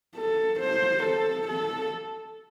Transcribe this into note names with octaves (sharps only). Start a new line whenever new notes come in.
A4
C5
A4
A4